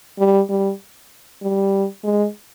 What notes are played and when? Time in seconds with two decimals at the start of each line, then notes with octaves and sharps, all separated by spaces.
0.19 G3
0.50 G3
1.42 G3
2.04 G#3